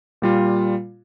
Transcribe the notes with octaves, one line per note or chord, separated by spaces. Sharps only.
A#2 G3 F4